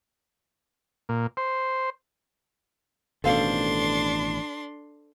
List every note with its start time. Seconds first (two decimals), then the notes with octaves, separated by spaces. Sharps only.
1.09 A#2
1.37 C5
3.24 A1 B2 D#3 D4 A4 C5 F5 C6